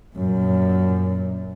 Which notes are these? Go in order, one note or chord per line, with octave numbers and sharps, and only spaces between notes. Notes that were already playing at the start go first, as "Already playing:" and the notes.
F#2 A#2